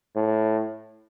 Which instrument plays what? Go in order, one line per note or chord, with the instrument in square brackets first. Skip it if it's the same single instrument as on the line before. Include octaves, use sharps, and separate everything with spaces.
[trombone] A2